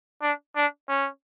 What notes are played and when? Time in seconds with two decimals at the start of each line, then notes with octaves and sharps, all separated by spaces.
0.22 D4
0.56 D4
0.89 C#4